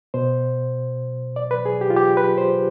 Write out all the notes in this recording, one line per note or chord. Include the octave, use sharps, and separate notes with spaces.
B2 C5
D5
B4
G#4
G4
F4
G4
B4
C5